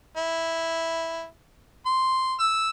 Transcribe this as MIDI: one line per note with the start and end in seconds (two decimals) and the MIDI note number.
0.17 1.26 64
1.86 2.34 84
2.40 2.70 88